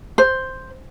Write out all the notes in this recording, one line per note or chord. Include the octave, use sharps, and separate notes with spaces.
C5